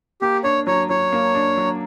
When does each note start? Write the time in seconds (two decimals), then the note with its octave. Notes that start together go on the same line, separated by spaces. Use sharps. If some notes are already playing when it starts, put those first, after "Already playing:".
0.22 A#3 G4
0.44 D4 C#5
0.67 F#3 C#5
0.89 F#3 C#5
1.13 A#3
1.35 D4
1.58 F#3